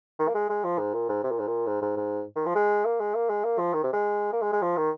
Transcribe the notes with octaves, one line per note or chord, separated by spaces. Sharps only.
D#3
A#3
G#3
G#3
F3
G#2
A#2
G#2
C3
A#2
G#2
A#2
G#2
G#2
G#2
D#3
F3
G#3
A#3
G#3
A#3
G#3
A#3
F3
D#3
C3
G#3
A#3
G#3
G#3
F3
D#3